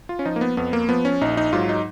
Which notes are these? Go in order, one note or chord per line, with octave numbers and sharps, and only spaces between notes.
F4
C#4
F3 D#4
A#3
B3
F2 B3
A#3
F3 B3
C#4
A#1 D#4
D#4
G#2 F#3 F4
D#4